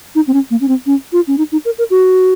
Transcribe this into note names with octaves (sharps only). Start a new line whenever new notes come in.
D#4
C4
C#4
A#3
C#4
C4
C#4
F4
C#4
D#4
D#4
A#4
A#4
F#4